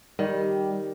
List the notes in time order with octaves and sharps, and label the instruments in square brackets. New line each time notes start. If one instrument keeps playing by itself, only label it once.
[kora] D#3 [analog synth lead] G3